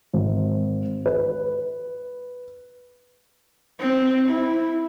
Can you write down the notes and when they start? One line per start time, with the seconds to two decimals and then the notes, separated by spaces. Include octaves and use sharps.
0.13 G#1
1.06 B4
3.80 C4
4.30 E4